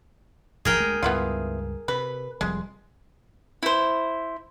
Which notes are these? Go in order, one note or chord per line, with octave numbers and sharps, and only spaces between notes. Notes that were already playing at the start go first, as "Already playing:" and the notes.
D#1 A#1 F3 G#4 A#4 G5
D2 G#3 A3
C#2 G2 B3 E4 F4
C3 B4
F1 F2 G3 G#3
E4 C5